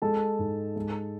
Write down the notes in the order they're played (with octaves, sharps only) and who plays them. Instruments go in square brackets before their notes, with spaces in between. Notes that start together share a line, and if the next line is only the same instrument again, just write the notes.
[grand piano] G#3 A4 A5
G#2
G#3